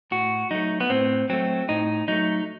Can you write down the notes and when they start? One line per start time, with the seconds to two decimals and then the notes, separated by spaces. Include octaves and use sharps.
0.11 A2 F#4
0.51 F#3 A3 D#4
0.80 B3
0.90 A2 C4
1.29 F#3 A3 C4
1.69 A2 D#4
2.08 F#3 A3 D#4